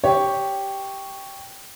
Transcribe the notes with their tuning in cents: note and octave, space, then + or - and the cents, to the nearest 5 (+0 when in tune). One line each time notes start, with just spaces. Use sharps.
G4 +0 C#5 +0